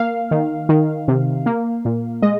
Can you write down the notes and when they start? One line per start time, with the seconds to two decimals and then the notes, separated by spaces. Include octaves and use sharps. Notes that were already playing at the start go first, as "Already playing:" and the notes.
Already playing: A#3 F5
0.31 D#3
0.69 D#3
1.08 C3
1.46 A#3
1.85 A#2
2.22 G#3 D#5